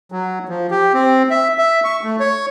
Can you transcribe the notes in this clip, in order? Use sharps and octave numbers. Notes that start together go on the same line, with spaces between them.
F#3
F3
G4
C4
E5
E5
C#6
A3
C#5